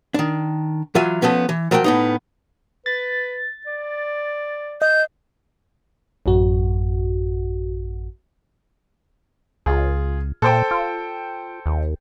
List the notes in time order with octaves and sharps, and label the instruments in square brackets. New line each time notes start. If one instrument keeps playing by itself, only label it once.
[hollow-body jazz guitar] D#3 D4
E3 F#3 F4 E5 G#5
F3 A3 B3 C#4
E3
F3 F#3 A#4 D5 G5
A2 B3 D#4
[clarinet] B4 [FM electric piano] A6
[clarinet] D5
[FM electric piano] D#5 [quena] G6
[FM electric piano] A1 F#2 F#4
[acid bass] C#2 [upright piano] F4 G#4
[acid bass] A#2 [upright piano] A4 C5 G5
[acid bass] F4
D#2